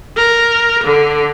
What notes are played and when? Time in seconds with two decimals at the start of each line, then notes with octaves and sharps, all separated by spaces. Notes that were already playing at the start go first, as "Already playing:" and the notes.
0.17 A#4
0.85 D3